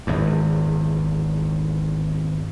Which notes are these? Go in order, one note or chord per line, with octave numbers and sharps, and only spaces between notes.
G#1 E2